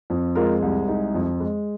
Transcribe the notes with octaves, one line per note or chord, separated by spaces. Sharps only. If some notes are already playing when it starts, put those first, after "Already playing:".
F2
G#3 F4 A#4
C2
G#3 D#4 G#4
F2
G#3